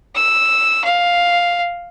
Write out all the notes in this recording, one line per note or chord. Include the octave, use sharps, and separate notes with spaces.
E6
F5